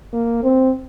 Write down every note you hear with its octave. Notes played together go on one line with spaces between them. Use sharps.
A#3
C4